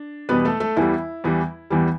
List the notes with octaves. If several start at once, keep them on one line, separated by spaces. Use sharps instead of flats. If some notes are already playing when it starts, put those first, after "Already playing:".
Already playing: D4
E2 B2 G3 B3 B4
A3 A4
A3 A4
E2 E3 G3 E4
E2 E3 G3
E2 E3 G3